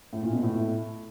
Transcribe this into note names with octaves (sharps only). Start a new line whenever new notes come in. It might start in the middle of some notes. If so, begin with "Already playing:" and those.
A2
A#2
B2
A2